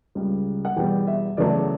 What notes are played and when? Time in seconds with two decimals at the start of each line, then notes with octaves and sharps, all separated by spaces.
0.15 C#2 C#3 G3
0.65 F#5
0.77 E2 B2 G3 G5
1.07 E5
1.37 E2 C#3 F#3 A3 D5